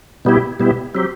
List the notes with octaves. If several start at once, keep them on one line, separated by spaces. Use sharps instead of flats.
B2 G3 B3 E4 G4
B2 G3 B3 E4 G4
F#3 C4 G4